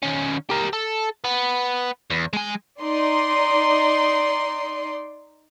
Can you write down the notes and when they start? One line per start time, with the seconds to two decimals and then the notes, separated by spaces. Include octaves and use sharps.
0.03 D#3 C#4
0.50 G4 A#4
0.73 A4
1.24 B3
2.11 E2
2.33 G#3 G#5
2.82 D#4 D5 C6